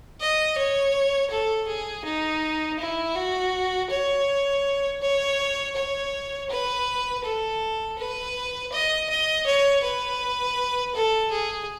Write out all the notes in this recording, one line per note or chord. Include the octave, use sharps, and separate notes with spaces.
D#5
C#5
A4
G#4
D#4
E4
F#4
C#5
C#5
C#5
B4
A4
B4
D#5
D#5
C#5
B4
A4
G#4